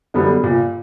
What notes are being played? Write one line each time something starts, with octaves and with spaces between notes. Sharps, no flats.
F#2 D3 G3 B3
A#2